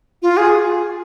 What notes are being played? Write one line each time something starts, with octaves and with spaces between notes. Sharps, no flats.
F4
G#4